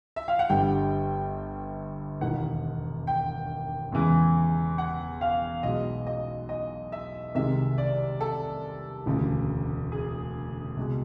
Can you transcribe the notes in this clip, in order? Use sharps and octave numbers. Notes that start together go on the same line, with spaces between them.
E5
F5
F#5
G1 G2 D3 G3 G5
E1 D#2 D#3 F#5
G5
E2 C#3 E3 G#3
F#5
F5
B1 B2 G#3 D#5
D#5
D#5
E5
C2 C3 D#3 G#3 E5
D5
A4
E1 D2 C#3
G#4
C2 B2 G#3